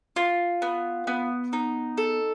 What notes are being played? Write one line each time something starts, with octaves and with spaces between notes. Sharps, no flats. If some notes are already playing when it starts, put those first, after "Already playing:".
F4
B3
B3
D#4
A4